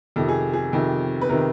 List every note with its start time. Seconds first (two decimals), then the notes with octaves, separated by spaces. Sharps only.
0.16 F2 C3 D#3 A4
0.29 G#4
0.53 G#4
0.73 F2 C3 D#3
1.21 B4
1.29 C3 D#3 A#4